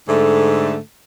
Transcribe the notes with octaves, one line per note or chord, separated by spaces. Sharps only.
G#2 D3 A3